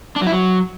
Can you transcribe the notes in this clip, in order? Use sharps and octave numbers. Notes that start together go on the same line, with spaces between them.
D4
F#3
E4
F#3